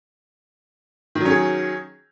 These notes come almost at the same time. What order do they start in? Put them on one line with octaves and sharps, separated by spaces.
D#3 F#3 C#4 G#4